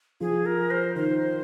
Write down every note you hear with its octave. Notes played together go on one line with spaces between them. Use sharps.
F3 G#4
A#4
C5
D#3 C5